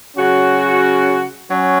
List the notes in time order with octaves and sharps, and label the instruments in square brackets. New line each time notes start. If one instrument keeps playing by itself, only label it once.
[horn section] C#3 F#3 C#4 F#4
F#3 C#4